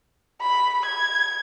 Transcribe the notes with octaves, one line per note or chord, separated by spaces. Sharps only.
B5
G#6